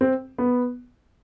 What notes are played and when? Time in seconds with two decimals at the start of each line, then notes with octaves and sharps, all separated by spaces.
0.01 C4
0.38 B3